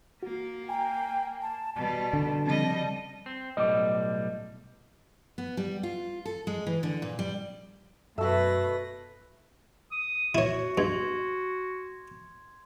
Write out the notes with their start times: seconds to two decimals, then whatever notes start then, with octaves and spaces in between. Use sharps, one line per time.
0.23 A#3 F#4
0.69 G5 G#5 A#5
1.42 A5
1.75 B2 G3 A5
2.13 D3
2.46 C#3 F3 G3 C4 D#5
3.26 C4
3.57 B1 A2 G3 D#5 D6
5.38 B3
5.57 G3
5.83 F4
6.25 A4
6.47 G#3
6.67 E3
6.83 D3
7.02 A#2
7.19 G3
8.18 F#2 B2 A3 F#4 B4 E6 A#6
9.92 D#6
10.35 E4 F#4 C#5
10.78 G2 C6 G#6